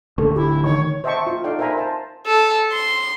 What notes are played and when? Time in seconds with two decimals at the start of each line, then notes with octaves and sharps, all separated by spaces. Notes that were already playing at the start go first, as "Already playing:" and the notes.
0.18 D1 D3 A3 A4 C#6
0.36 E4 G4
0.64 D#3 C#5 C#6 G#6
1.04 C5 D#5 E5 G5 A5 C#6
1.27 F4
1.44 D#4 A4 D5 D#5 F5 G5
1.59 A#4 C5 E5 G#5 A#5 B5
1.77 C5 A5
2.26 A4
2.72 C6